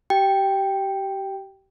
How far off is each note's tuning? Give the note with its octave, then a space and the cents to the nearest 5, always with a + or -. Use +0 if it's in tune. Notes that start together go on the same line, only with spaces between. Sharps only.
G4 -30 G5 +0